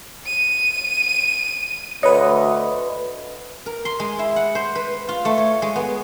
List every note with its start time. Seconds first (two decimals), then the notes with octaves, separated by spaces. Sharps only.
0.25 D#7
2.03 D2 B4 C#5 D#5
3.66 A#4
3.85 C6
4.00 G#3
4.19 E4
4.36 F#5
4.55 C5
4.75 B4
5.08 F4
5.25 A3
5.38 C#5
5.62 G#3
5.76 B3